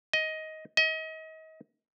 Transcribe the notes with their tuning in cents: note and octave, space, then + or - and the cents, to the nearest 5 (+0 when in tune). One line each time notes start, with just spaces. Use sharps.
D#5 +15
D#5 +35